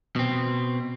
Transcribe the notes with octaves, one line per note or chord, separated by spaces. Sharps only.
B2 C4